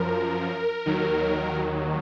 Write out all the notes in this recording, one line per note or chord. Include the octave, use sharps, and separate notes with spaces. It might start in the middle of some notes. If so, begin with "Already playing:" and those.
Already playing: F#2 F3 A#4
D#2 D#3 F#3